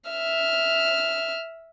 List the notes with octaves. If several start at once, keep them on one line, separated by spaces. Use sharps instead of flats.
E5 F6